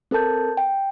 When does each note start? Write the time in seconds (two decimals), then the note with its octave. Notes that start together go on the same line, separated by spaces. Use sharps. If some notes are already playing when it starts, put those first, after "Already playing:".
0.11 C4 A4 A#4 A5 G6
0.57 G5